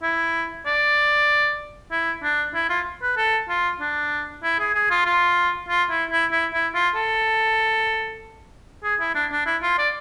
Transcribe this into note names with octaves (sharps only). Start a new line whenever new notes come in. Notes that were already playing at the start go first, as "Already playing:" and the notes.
E4
D5
E4
D4
E4
F4
B4
A4
F4
D4
E4
G#4
G#4
F4
F4
F4
E4
E4
E4
E4
F4
A4
G#4
E4
D4
D4
E4
F4
D5